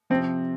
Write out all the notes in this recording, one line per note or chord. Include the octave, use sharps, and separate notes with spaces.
C3 F3 C4